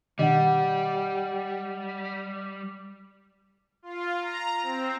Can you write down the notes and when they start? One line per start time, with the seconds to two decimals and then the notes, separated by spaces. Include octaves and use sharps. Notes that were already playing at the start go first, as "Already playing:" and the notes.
0.19 B2 D#3 G3 D4 D#5 F#5
3.82 F4
4.21 A#5
4.63 C4